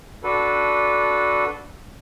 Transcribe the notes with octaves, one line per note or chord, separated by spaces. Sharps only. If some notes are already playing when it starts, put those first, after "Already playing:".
D4 F#4 A4 B4